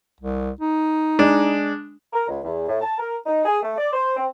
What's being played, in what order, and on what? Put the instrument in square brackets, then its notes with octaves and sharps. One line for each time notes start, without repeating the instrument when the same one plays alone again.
[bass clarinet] C2
D#4
[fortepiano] G#3 D4
[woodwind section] A#4
C#2
E2
A2
A5
A#4
D#4
G#4
A3
D5
C5
C4